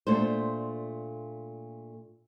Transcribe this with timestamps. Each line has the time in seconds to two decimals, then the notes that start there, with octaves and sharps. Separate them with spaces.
0.07 A#2 A3 D4 C5